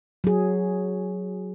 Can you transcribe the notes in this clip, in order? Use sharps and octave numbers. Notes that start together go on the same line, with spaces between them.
F#3 G#4